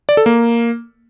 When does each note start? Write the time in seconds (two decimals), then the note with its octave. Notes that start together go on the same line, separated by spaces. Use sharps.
0.09 D5
0.17 A4
0.26 A#3